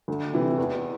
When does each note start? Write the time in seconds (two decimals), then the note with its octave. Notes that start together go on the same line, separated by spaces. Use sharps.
0.08 D2
0.33 C3 E3
0.58 E2